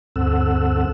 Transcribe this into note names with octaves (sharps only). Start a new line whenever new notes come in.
D2 G2 C4 A4 F#5 E6